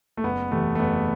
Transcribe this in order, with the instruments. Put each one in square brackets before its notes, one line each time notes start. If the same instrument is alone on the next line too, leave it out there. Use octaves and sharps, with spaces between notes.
[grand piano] A3
F#1 B3
E2 C3 E3 A3
A3
F#1 B3